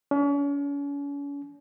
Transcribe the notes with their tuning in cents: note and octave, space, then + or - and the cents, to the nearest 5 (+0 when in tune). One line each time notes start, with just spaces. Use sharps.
C#4 +40